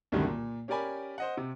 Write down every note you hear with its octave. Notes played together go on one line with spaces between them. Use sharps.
C2 F#2 A2 D3 D#3 G3
A#2
C#4 G4 A#4 D5 G#5 B5
C5 D#5 F#5
C3